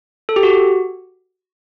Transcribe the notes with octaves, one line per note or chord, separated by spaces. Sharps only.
A4
G4
F#4